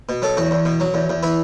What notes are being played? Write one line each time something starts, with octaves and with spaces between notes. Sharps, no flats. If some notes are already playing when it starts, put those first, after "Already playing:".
B2
F#3 A4
E2 F#4
E2
B2
F#3
E2
E2
E3 E4